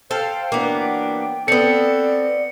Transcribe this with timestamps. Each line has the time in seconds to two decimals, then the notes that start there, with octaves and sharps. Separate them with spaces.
0.11 A4 C5 F5 G5
0.52 E3 F#3 A#3 B3 D4
1.48 B3 C4 A4 D5 C#7